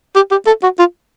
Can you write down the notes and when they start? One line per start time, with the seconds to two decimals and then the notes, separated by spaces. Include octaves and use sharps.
0.15 G4
0.31 G4
0.46 A4
0.63 F#4
0.79 F4